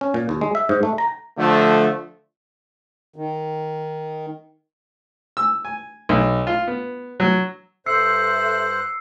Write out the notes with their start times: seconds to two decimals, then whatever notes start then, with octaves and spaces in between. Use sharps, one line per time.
0.01 C#4
0.14 A#2
0.29 D#2
0.41 G#3
0.55 E5
0.69 G#2
0.83 A3
0.98 A#5
1.38 D3 F3 A3
3.16 D#3
5.37 E6
5.65 G#5
6.09 B1
6.47 F4
6.67 B3
7.20 F#3
7.86 G2 A4 C5 E5 E6 F#6 C7 C#7